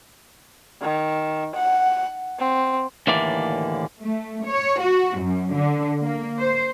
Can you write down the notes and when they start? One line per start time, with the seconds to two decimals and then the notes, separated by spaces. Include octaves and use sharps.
0.82 D#3
1.55 F#5
2.39 C4
3.07 D#2 A2 D3 E3 A#3 D5
4.03 A3
4.47 C#5
4.81 F#4
5.19 F#2
5.55 D3
6.02 A#3
6.38 C5